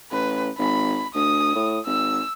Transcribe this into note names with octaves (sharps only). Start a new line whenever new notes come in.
A1 B4
G#1 B5
D2 D#6
A2
G#1 E6